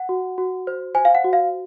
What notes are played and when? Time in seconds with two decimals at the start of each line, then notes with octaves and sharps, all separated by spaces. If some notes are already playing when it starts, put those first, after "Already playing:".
Already playing: F#5
0.09 F#4
0.38 F#4
0.67 C5
0.95 C5 G#5
1.05 F5
1.15 F#5
1.24 F#4
1.33 F5